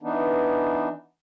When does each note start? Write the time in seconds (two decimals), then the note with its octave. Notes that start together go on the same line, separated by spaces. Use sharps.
0.03 E3 B3 D4 D#4